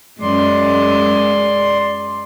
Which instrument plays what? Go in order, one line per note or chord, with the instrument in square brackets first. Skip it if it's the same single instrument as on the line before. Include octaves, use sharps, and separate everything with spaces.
[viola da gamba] F#2 G#3 [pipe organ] D5 C6